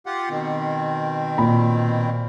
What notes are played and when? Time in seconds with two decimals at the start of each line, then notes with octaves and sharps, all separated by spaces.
0.06 F4 G4 F#5
0.30 B2 D#3 C4
1.38 A#2 B5